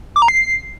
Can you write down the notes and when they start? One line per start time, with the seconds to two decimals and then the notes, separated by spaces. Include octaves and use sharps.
0.16 D6
0.22 A#5
0.28 C7